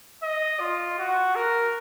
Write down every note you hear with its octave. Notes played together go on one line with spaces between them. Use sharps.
D#5
F4
F#4
A#4